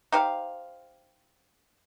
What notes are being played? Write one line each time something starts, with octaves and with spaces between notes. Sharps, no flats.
D#4 G4 C5 F5